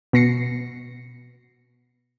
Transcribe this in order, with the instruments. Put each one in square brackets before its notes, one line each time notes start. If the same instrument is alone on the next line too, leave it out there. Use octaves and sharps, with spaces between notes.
[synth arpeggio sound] B2 B3 A#6 C7 C#7